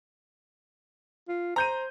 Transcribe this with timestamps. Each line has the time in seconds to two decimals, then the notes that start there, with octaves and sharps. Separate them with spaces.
1.28 F4
1.56 C5 A#5 G6 D#7